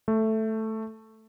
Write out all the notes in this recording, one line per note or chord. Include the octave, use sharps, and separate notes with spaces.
A3